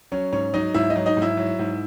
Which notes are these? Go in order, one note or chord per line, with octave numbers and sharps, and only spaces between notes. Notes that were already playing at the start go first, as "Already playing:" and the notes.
F#3 C#4 C#5
G#2 C#4 C#5
F#3 D#4 D#5
G#2 E4 E5
D#4 D#5
F#3
D#4 D#5
G#2
E4 E5
F#3
G#2